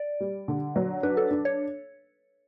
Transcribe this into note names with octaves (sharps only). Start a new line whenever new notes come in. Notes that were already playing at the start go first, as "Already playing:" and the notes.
Already playing: D5
G3
D3
F#3
D4 B4
A4
D4
C#5